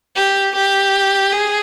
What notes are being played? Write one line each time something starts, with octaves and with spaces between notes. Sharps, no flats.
G4
G4
G#4